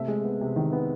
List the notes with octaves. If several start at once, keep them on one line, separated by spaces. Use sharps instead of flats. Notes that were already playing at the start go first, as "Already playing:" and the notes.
Already playing: C3 A3 E5
G#3
B3
C3
D#3
B3